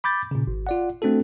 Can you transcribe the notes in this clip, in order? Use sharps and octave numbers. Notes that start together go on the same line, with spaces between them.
B5 D6 G6 A6
A#2 C#3
G#1
F4 D5 F#5
A3 C4 D4 F#4 A4